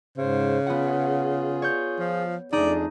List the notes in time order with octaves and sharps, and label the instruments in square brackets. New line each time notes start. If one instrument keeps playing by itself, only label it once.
[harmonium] G#2 C5 [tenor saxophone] C#3
[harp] B3 F#5 [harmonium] F4 G#4
[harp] C#5 G6
[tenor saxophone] F3
[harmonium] F2 D4 G#4 [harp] A3 D#4 [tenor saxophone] D5